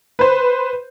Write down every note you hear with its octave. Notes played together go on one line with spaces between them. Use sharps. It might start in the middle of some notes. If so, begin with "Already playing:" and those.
B4 C5